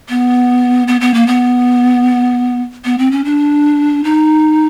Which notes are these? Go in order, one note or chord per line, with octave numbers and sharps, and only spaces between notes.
B3
B3
B3
A#3
B3
B3
C4
C#4
D4
D#4